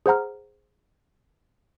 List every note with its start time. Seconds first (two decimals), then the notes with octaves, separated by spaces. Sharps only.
0.06 G#4 C5 F#5 A#5 F6